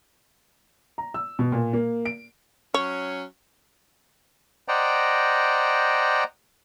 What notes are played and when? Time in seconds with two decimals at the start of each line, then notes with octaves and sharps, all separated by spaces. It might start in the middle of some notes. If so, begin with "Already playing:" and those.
0.98 A#5
1.14 E6
1.39 B2
1.52 A#2
1.73 A#3
2.06 D7
2.74 F#3 C#4 C#5
4.68 C5 D5 D#5 F#5 G5 A#5